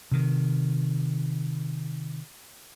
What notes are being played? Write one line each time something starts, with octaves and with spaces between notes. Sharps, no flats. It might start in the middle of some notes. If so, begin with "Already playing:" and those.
C3 D#3